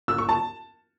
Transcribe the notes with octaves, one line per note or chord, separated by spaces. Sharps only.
E6
C#6
A5